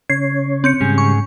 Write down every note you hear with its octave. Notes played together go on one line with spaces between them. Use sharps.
C#3 C#4 C#5 G#6 C7
C4 G6 C#7
G#2 C#3 G3 C#4 G#4
C#6